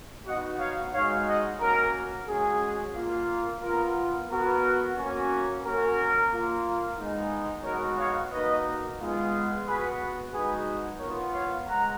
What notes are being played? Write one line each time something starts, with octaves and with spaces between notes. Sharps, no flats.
B3 D#4 F#4 D#5 F#5
C#5 F5
G#3 D#4 F#4 C#5 F5
D#5 F#5
A#3 C#4 F#4 A#4
G#3 C#4 F#4 G#4
A#3 F4
B3 F4 A#4
B3 F#4 A#4
A#3 C#4 F#4
A#3 C#4 F#4 A#4
A#3 F4
G#3 B3 D#4
G#3 B3 D#4 F#4 A#4 C#5
C#5 F5
A#3 D#4 F#4 B4 D#5
G#3 B3 F4
B3 F#4 G#4 B4
G#3 D#4 F#4 G#4 B4
B3 F4 A#4 C#5
C#5 F5
G#3 F#5 A#5